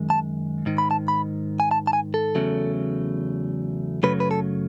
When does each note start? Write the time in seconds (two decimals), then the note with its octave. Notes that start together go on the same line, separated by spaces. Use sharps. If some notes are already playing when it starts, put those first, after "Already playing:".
Already playing: F#2 D#3 G#3
0.10 A5
0.66 G#2 D#3
0.78 B5
0.91 A5
1.08 B5
1.60 G#5
1.71 A5
1.87 A5
1.93 G#5
2.14 A4
2.35 E2 C#3 F#3 A3
4.03 F#2 C#3 F#3 A3 B4
4.20 B4
4.31 A4